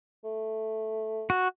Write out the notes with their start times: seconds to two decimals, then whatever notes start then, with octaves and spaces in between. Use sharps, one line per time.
0.24 A3
1.30 F#4